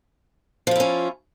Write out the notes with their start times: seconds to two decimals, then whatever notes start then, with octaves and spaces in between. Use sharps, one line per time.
0.67 F3
0.71 F4
0.76 E4
0.80 C#4